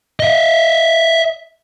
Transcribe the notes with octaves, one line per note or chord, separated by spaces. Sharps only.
D#5 E5